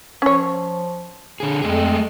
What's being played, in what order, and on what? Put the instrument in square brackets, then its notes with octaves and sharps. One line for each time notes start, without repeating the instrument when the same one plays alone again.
[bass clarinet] F3 [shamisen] C#4 C#5
[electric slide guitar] D3 G#4
[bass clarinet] F2 [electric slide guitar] G#3 A3 G#4